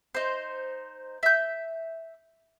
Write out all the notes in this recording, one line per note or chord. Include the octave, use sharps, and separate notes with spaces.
D#4 C5
E5 G6